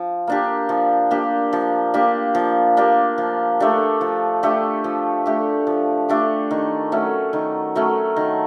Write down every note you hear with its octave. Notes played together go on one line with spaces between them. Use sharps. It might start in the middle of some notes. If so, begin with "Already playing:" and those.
Already playing: F3
A#3 D4 G4
F3
A#3 D4 G4
F3
A#3 D4 G4
F3
A#3 D4 G4
F3
A3 D4 G4
F3
A3 D4 G4
F3
A3 D4 G4
F3
A3 D4 G4
D#3
F#3 A3 C#4
D#3
F#3 A3 C#4
D#3